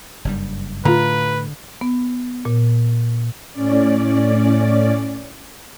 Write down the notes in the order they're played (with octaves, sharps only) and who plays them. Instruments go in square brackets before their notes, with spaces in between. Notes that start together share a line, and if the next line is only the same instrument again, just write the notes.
[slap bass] F#1 G2 G3
[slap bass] A2 [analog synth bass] D3 [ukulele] F4 A#5 [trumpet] B4
[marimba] B3
A#2
[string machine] A2 C#4 D5